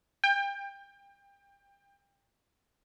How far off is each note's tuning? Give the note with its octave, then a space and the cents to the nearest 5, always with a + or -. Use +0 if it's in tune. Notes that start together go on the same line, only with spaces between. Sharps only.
G5 +25